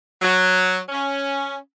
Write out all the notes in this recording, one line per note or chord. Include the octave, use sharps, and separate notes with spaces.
F#3
C#4